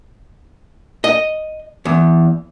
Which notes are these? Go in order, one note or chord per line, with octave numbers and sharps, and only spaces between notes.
D#5
E2